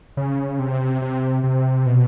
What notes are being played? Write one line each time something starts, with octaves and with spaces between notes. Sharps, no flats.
C#3
C3
C3
C3
B2